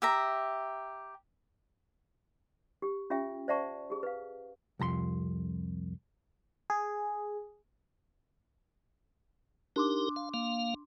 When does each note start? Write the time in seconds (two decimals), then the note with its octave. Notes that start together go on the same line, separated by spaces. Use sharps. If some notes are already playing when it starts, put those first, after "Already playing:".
0.02 G4 E5 A#5
2.82 G4
3.10 C#4 F4 G4 E5 G5
3.48 C5 D5 E5 F#5 A5 C#6
3.90 G4 G#4
4.03 B4 F5
4.79 C2 F2 A#5 C6
6.70 G#4
9.76 D4 D#4 G4 A#4 C6 D6
10.16 F5
10.34 A#3 F5